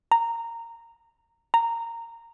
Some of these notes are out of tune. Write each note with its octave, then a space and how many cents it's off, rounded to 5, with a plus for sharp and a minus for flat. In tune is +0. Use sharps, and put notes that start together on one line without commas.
A#5 -15
A#5 -15